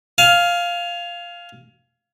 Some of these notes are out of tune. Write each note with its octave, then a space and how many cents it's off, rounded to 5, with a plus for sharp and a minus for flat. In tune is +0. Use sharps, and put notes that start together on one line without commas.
F5 +0 G#5 +30